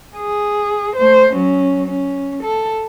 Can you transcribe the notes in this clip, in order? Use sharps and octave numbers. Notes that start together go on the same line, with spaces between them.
G#4
A3 C5
F#3 C#4
C#4
A4